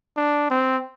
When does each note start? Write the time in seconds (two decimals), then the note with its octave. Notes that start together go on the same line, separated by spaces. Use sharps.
0.16 D4
0.50 C4